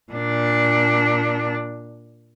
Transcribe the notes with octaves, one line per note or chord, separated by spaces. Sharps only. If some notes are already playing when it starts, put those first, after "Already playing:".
A#2 D4